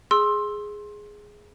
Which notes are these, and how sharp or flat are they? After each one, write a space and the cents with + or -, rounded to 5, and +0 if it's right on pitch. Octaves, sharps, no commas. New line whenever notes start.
G#4 +0 C6 +20 E6 +0